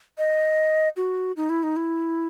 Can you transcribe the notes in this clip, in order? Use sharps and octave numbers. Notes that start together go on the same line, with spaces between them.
D#5
F#4
D#4
E4
D#4
E4